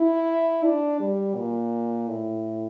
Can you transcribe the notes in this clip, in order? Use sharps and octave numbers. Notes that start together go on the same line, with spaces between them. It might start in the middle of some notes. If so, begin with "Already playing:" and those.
Already playing: E4
D4
G3
A#2
A2